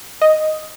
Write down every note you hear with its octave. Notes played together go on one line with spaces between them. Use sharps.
D#5